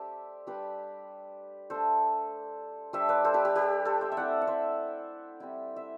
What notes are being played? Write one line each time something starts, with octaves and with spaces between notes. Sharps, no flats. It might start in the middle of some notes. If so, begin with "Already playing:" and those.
Already playing: A3 D4 G4 C5 D5 E5
G3 D4 G4 B4
A3 D4 A4 C5
G3 D4 C5 E5
B4 D5
A4 C5
G4 B4
G4
G4 B4
A4 C5
C5 E5
E5
A3 C4 E4 D5 F#5
F#5
C5 E5
G3 C4 E4
E5